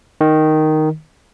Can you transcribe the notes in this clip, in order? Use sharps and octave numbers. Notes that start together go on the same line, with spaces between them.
D#3